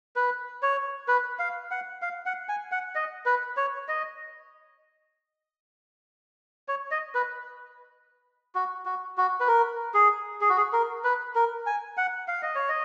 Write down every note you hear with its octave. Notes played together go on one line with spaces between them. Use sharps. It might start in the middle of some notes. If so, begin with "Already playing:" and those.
B4
C#5
B4
F5
F#5
F5
F#5
G#5
F#5
D#5
B4
C#5
D#5
C#5
D#5
B4
F#4
F#4
F#4
B4
A#4
G#4
G#4
F#4
G#4
A#4
B4
A#4
G#5
F#5
F5
D#5
C#5
D#5